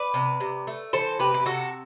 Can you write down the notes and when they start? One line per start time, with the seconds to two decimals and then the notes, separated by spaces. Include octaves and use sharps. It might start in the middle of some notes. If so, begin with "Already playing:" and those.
Already playing: B4 D5
0.14 C3
0.40 C3
0.67 A3
0.93 E3 A4 C5
1.19 C3 G4 B4
1.34 G4
1.46 C3 F#4 A4